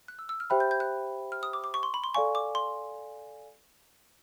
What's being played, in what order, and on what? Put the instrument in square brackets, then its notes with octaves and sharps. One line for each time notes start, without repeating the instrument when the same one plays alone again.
[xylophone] F#6
E6
E6
F6
[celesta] G4 C5 E5 G5 B5 [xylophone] F#6
[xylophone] G6
G6
F#6
F6
D#6
D6
D6
C#6
C6
B5
C6
[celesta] A4 D5 F5 G#5 [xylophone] C#6
[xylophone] D6
C6